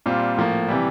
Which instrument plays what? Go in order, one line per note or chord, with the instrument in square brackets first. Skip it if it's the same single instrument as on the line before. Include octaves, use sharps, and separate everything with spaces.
[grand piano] A#2 G3 C4 F4
A2 F3 A#3
C3 E3 G3